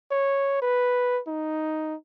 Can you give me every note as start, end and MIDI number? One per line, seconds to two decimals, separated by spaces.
0.11 0.57 73
0.62 1.20 71
1.27 1.95 63